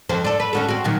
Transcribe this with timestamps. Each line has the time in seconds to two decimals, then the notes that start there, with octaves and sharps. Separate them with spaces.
0.09 F2 C5
0.25 D4 A4
0.40 B4
0.53 C#4 F#4 A4
0.69 C4 F#4
0.84 A#2 D#3 F#3